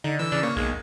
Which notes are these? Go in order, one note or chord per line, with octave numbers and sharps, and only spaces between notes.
D3 D#4
E3 E6
C#3 D4
A#3 C#5
B1 G#3